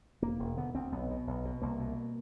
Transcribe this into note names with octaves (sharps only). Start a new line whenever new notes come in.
E1 A#3
E1
D3 B3
D2 C4
B1 B3
B2
B1
B2
C2 A#3
B2